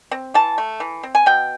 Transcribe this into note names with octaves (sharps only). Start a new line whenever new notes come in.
C4
E3 A5
A3
E3
C4
G#5
B2 G5